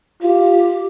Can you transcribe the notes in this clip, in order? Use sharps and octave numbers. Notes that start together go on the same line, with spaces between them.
F4 G4